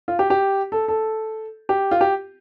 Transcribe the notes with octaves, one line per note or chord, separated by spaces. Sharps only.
F4
G4
G4
A4
A4
G4
F4
G4